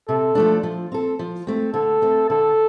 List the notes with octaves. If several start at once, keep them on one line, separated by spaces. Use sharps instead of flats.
C3 A4
F3 A3 D4
F3
C4 A4
F3
A3 C4
D3 A4
A3 C4
D3 A4